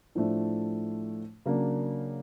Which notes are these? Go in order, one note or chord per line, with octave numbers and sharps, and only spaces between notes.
A2 F3 A3 D4
C#3 F#3 A#3 D4